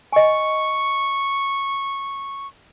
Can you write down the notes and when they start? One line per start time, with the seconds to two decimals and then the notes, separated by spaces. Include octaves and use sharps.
0.12 D#5 G#5 C#6